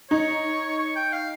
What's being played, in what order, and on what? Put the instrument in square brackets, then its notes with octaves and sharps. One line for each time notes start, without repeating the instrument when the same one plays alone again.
[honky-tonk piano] D#4 [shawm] C#5
[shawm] C#5
G5
F5